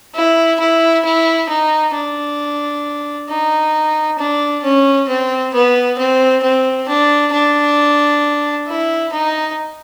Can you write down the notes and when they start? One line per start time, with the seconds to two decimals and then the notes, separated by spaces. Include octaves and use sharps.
0.15 E4
0.60 E4
1.04 E4
1.49 D#4
1.94 D4
3.29 D#4
4.18 D4
4.63 C#4
5.08 C4
5.53 B3
5.98 C4
6.43 C4
6.88 D4
7.33 D4
8.67 E4
9.12 D#4